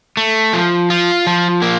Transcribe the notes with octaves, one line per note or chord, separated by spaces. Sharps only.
A3
F3
F4
F3
A#3